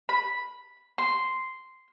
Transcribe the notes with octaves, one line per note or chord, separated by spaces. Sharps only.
B5
C6